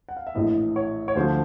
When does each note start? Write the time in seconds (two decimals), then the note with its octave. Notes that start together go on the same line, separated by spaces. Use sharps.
0.09 F#5
0.17 F5
0.27 E5
0.35 A#1 A2 E3 D#5
0.76 C#5
1.08 C#5
1.15 D2 D3 F3 C5